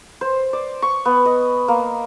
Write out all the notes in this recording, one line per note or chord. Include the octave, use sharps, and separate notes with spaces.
C5
D5
C#6
B3
D#5
A#3